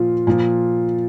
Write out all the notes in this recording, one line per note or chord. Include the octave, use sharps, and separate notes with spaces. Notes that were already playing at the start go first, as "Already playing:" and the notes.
Already playing: A#2 F3 F4
A#2 F3